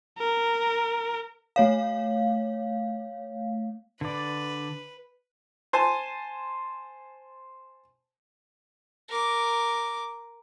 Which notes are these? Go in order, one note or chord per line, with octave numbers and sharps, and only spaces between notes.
A#4
A3 C#5 F5
D3 B4 D5
C5 G#5 A5
A#4 D6